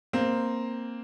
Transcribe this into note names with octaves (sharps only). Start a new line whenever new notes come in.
A#3 C4